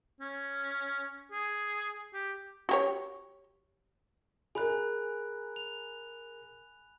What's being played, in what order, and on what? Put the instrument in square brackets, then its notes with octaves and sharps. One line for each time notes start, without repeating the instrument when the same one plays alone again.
[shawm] C#4
G#4
G4
[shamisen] F#4 G4 C#5
[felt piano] G#4 A#4 [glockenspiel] G#5 B5 F#6
[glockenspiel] F7